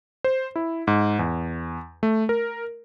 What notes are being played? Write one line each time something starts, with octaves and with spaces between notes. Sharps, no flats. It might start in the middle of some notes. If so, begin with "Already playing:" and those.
C5
E4
G#2
E2
A3
A#4